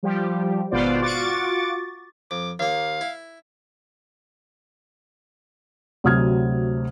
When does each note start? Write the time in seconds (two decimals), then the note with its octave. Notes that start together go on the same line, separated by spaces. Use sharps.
0.03 F3 G3 G4
0.71 G#1 B2 B3 F4 C5 D5
1.01 F4 F#4 C#6 D6 A6
2.31 F2 D6
2.59 D#2 A#3 F5
3.01 E4
6.04 D2 C3 F#3 D#6 F6 G#6